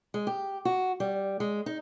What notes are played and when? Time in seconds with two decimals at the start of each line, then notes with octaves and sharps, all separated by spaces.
0.14 G#3
0.27 G4
0.65 F#4
1.00 G3
1.40 G#3
1.66 D#4